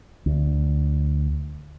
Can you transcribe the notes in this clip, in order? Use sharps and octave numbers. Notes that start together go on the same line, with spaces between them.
D2